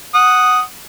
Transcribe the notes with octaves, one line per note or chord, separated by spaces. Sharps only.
F#5 D#6